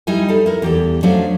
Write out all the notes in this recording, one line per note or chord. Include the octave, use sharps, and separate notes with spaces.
G3 D#4 E4 G#5
G3 A4
E4 A#4
E2 G4 A4
F3 F#3 A3 C#4 D4 D5